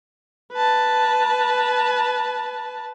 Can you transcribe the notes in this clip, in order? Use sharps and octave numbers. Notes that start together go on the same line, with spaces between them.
B4 A5